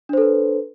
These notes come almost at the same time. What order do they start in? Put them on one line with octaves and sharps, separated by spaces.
D4 C5 A4 B4